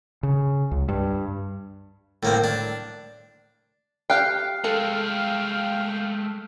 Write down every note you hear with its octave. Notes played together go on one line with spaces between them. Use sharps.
C#3
C#2
G2
A2 A#3 C4
D4
G4 F5 G5 F6 F#6 C7
G#3 A3 A4 F5 G5